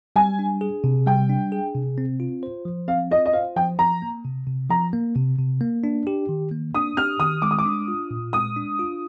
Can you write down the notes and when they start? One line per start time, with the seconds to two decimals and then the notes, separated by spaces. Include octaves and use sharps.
0.16 G3 G#5
0.39 D4
0.61 G#4
0.84 C3
1.07 G3 G5
1.29 D4
1.52 G#4
1.75 C3
1.98 C4
2.20 F4
2.43 C5
2.65 F3
2.88 C4 F5
3.11 F4 D#5
3.26 D#5
3.33 C5 F5
3.56 F3 G5
3.79 F3 A#5
4.02 A#3
4.25 C3
4.47 C3
4.70 F3 A#5
4.93 A#3
5.16 C3
5.38 C3
5.61 A#3
5.84 D4
6.07 G4
6.29 D#3
6.51 A#3
6.75 D4 D#6
6.97 G4 F6
7.20 D#3 D#6
7.42 G#3 D6
7.51 D#6
7.59 D6
7.65 D4
7.88 F4
8.11 A#2
8.33 G#3 D#6
8.56 D4
8.79 F4